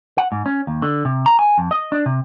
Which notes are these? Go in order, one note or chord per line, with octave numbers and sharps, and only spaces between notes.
F#5
G#2
C#4
D#2
D3
C3
A#5
G#5
F2
D#5
D4
C3